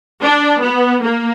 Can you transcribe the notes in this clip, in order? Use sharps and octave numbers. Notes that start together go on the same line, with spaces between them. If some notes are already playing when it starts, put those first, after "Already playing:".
D4
B3
A#3